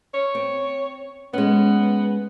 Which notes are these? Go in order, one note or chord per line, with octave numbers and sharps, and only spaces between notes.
C#5
C4
G#3 B3 C#4